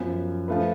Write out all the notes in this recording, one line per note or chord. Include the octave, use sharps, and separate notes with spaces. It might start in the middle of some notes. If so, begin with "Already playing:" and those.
Already playing: F#2 F3 B3
F3 A3 F4 B4